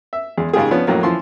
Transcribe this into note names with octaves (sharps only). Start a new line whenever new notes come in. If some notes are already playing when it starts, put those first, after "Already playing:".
E5
E2 G#3
G#2 C#3 G#3 F4 G4 G#4
F3 B3 C#4 D4
F2 A2 F#3 A#3
E3 F3 C6